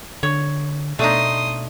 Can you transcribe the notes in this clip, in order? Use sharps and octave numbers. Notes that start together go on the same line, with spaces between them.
D3 C#5
B2 A3 D4 D#4 C6 D#6